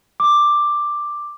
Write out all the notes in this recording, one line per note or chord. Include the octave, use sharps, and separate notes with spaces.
D6